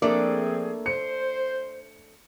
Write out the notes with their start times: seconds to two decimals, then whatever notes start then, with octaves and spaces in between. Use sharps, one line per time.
0.02 F3 A3 A#3 C4 D4 G#4 D5
0.86 C5 C#7